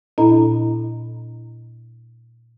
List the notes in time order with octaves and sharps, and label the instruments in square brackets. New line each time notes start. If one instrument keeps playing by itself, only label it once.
[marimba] A#2 D4 E4 A4 D#5 A#5